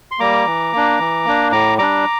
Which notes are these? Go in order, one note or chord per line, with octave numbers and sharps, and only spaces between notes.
C6
G3 A#3 A#5 D6
E3
A#3 D4
E3
A#3 D4
A2 A#5 D6
G3 D4 A#5 D6